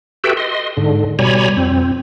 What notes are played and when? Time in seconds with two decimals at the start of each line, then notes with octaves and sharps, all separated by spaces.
0.24 F#4 G4 A4 B4 E5 G5
0.37 D#5 C6
0.77 G#2 D3
1.19 B2 G3 C#5 G#5 A#5 B5
1.57 F2 C4